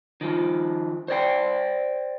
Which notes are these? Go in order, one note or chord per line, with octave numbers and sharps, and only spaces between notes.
D#3 F3
C5 D5 G5